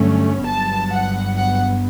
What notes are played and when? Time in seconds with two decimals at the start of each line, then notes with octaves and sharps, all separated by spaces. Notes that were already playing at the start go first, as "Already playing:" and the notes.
Already playing: G2 D3 F#3 A3 C#4
0.45 G1 G2 F#3 B3 A5
0.92 F#5
1.38 F#5